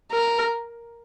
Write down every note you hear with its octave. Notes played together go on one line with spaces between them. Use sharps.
A#4